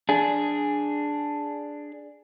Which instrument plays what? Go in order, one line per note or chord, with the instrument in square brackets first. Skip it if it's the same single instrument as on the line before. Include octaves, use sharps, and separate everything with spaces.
[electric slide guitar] D4 G#4